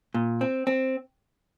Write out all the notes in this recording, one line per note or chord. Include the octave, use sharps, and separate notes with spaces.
A#2
C4
C4